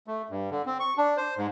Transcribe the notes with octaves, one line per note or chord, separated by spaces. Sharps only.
A3
G2
D3
C4
C#6
D4
C5
G#2